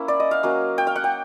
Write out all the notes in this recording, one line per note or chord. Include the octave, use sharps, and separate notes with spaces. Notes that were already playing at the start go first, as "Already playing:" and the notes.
Already playing: A#3 C#4 E4
D5
D#5
F5
F#3 A#3 C#4
G5
F5
F#5
G5